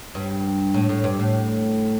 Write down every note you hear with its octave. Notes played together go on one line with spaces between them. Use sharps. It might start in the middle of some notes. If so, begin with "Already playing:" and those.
G2
A2
A2
G2
A2